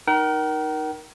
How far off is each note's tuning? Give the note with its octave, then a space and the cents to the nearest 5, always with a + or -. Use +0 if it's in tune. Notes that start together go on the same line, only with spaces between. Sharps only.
D#4 +0 A#4 +20 G5 -45